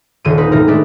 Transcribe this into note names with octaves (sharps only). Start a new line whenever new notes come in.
D#1 D3 D#7
C4 D#4 B4
A2 C3 E3 A#4
G#3 A3 D4 B4